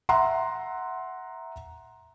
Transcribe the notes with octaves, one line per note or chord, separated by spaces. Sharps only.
E5 F#5 A#5 C6